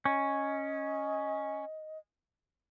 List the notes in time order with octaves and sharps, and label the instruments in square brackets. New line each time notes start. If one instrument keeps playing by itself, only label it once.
[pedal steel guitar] C#4 [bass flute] D#5